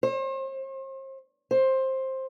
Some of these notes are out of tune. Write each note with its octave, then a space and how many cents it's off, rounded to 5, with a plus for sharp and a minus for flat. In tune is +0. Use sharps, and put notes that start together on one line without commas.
C5 +40
C5 +15